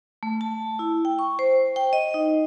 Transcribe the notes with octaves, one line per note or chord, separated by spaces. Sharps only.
A3
A5
E4
G5
C#6
C5
G5
D#5
D#4